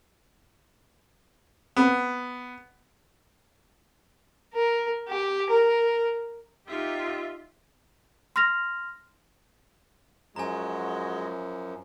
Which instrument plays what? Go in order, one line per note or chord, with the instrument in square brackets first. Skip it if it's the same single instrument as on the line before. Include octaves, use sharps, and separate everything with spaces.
[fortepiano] B3
[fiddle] A#4
G4
A#4
[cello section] D#4 G4 [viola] F4 E5
[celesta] C6 F6 A#6 F7
[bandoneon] F#2 F3 [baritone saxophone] G#3 [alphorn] F#4 [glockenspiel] G#5 A#5